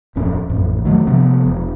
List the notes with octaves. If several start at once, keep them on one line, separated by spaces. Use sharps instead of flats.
D1 F2 C#4
A1 F2
B1 D#3 F#3 A3
C3 F3 B3
E1